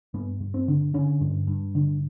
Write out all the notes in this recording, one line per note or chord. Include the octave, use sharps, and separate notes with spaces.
G2 B3
G2
C4
D3
D3 C#4
G2
G2
D3